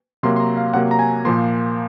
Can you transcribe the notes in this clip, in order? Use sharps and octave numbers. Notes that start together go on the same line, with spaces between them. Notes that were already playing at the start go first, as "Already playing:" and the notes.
C3 F#3 A#3 C6
C6
A#5
F5
C3 F#3 A#3 F#5
A#5
G#5
A#2 F3 A#3 C6